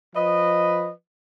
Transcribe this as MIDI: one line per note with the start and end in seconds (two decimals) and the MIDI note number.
0.16 0.91 53
0.16 0.91 71
0.16 0.91 75